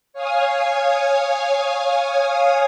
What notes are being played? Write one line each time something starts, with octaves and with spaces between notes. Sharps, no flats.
C#5 F5 G#5 D#6